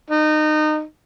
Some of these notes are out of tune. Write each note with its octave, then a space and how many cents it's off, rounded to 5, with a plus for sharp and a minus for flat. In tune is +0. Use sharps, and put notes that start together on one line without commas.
D#4 -25